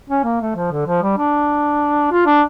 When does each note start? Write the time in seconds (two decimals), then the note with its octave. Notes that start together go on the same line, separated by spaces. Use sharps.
0.10 C#4
0.24 A#3
0.41 A3
0.55 F3
0.71 D3
0.86 F3
1.03 G3
1.18 D4
2.11 F4
2.26 D4